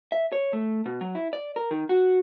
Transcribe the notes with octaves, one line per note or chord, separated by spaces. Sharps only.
E5
C#5
A3
B2
F#3
E4
D5
A#4
D#3
F#4